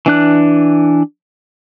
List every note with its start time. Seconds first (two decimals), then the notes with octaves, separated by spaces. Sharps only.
0.06 E3 D4 F#6